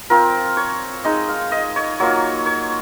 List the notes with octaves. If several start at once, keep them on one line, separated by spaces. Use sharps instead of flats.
F3 C4 F4 A#4
C#5
G#3 D#4 D#5
F5
D#5
C#5
F#3 A#3 F4 C#5
C#5